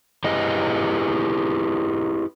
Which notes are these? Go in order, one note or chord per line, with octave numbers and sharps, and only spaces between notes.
E4 G4 G#4 B4 D#5